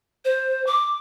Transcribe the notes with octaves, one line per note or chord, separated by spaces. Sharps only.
C5
D6